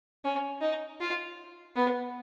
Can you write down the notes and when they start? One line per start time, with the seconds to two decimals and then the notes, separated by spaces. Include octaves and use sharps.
0.24 C#4
0.61 D#4
1.00 F4
1.76 B3